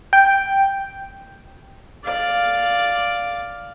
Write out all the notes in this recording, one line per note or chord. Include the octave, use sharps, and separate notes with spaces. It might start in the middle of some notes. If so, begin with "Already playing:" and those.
G5
D5 F5